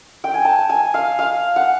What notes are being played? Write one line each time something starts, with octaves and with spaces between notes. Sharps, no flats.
G5
G#5
A5
G#5
F5
F5
F#5